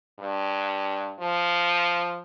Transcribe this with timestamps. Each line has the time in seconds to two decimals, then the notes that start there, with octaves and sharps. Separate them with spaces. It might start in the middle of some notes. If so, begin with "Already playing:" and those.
0.19 G2
1.20 F3